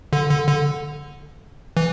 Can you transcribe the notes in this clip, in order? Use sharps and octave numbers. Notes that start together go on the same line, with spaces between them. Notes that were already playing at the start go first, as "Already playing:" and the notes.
D3
D3
D3
E3